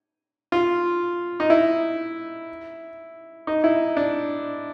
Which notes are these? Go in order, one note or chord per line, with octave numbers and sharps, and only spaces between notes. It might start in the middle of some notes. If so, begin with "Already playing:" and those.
F4
D#4
E4
D#4
E4
D4